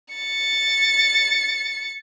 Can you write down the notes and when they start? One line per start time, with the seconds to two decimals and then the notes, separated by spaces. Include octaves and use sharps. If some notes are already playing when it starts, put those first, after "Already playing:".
0.14 A6 C#7